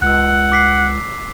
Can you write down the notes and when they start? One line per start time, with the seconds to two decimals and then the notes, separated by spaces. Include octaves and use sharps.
0.02 C#2 F#5 E6 F#6
0.52 D6 B6 C7